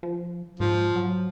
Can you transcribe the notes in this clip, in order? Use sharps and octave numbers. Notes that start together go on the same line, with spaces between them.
F3
G#2 F3
F#3